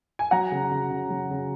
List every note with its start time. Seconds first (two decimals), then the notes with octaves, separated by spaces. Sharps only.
0.19 G#5
0.31 F#3 F#5 A#5
0.52 C#3
0.72 C#3
0.91 C#3
1.10 F#3
1.31 C#3